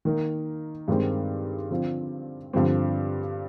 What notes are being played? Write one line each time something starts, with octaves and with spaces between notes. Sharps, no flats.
D#3 A#3 D#4 A#4
G2 D#3 G#3 C4
D3 F3 C4 F4
G2 D3 F3 C4